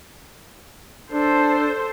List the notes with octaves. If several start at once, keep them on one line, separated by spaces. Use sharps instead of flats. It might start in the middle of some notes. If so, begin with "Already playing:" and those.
D4 A4 C5